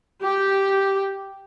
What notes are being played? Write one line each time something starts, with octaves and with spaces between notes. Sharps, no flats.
G4